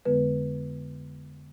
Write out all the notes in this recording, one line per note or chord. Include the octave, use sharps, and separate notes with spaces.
F2 D3 G#3 B3 B4